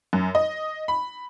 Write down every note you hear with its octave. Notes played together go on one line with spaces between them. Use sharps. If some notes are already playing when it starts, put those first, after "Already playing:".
F#2
D#5
B5